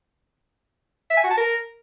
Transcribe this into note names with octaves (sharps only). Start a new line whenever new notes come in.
E5
G#5
F#4
A5
A#4